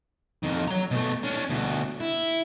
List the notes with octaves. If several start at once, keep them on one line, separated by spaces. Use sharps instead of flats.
F2 D#3
F#3 A#5
B2 A3
C#4 D4
D2 B2
E4